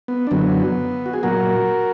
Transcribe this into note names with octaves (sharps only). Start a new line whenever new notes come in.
B3
D4
F#2 D3 F#3 B3
F#4
G#4
A#2 F#3 F#4 A#4